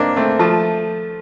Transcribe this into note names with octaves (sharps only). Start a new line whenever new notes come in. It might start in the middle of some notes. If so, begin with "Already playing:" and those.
Already playing: A#3 C4 D4 D#4
A3 C4
F3 A3